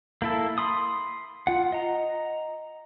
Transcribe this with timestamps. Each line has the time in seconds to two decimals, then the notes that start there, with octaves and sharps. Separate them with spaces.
0.22 A#3 E4 A4
0.58 B5 C6 D#6
1.47 F4 F#5
1.72 D#5 A#5